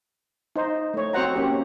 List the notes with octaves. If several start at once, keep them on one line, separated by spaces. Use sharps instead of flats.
D#4 C5
A3 C#5
C4 F#4 C5 F#5 A#5
A#3 C#4 G4